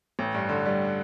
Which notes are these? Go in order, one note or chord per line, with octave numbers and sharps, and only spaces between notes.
A1
G2
D3
G3